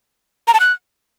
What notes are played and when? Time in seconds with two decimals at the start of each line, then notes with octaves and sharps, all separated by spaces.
0.48 A#5
0.54 A5
0.60 F#6